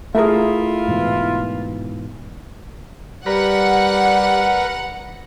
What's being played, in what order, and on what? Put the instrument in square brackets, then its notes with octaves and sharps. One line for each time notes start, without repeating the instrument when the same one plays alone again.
[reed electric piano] A3 A#4 [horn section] E4 F4 [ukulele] G#4 E5
[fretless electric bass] G#2 B2 E3
[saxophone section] G3 [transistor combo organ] A#4 B4 [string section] F#5